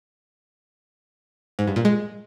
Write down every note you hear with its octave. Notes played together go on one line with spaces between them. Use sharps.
G#2
G2
A#2
G#3